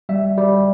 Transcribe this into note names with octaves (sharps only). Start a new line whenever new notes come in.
G3 E5
G3